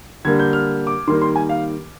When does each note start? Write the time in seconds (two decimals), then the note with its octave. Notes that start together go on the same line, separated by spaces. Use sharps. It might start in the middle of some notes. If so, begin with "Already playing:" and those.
0.25 D3 G3 A#3 G#6
0.40 G6
0.53 F6
0.87 D6
1.08 D#3 G3 A#3 C6
1.22 C6
1.36 G#5
1.49 F5